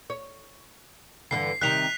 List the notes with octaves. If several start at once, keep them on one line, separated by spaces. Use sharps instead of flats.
C#5
G2 D3 E3 C7
C3 D#3 G3 F#6 B6 F7